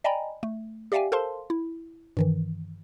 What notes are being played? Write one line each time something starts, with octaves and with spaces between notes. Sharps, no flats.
D5 D#5 G5 G#5 A#5 B5
A3
G4 D5 E5 F5 G5 G#5
A4 A#4 C5 F5 A5 C6
E4
G2 D#3 E3